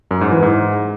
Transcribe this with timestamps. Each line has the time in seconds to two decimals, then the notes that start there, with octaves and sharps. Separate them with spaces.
0.11 F#2
0.21 G#2
0.32 E3
0.43 G#2